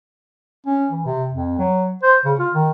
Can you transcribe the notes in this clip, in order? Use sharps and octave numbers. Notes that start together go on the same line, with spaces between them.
C#4
E3
C3
F2
F#3
C5
C#3
F4
D#3